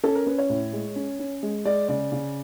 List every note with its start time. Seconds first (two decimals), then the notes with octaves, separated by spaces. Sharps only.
0.03 C#4 A4
0.15 A#4
0.26 C#4 B4
0.38 C#5
0.50 A2
0.73 G#3
0.96 C#4
1.19 C#4
1.43 G#3
1.65 G#3 D5
1.88 C#3 D5
2.12 C#3